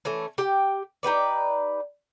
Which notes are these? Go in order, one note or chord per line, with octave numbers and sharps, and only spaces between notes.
E3 A3 C#4
G4 G5
D#4 G4 B4 D5